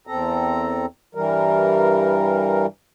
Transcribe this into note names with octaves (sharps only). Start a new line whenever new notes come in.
E2 C4 A4 A#5
G2 E3 G3 A#4